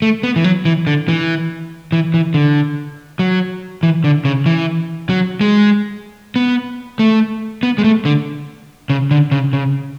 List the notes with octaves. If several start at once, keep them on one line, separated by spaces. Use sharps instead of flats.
A3
B3
E3
F#3
E3
D3
E3
E3
E3
D3
F#3
E3
D3
C#3
E3
F#3
G#3
B3
A3
B3
G#3
A3
D3
C#3
D3
C#3
C#3